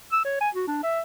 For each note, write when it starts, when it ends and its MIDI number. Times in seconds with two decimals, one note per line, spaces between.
0.12 0.20 88
0.25 0.40 73
0.41 0.49 80
0.55 0.67 66
0.68 0.79 62
0.83 1.01 76